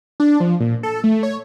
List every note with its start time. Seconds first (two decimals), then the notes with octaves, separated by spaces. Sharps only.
0.20 D4
0.40 F3
0.60 A#2
0.83 A4
1.04 A3
1.23 C#5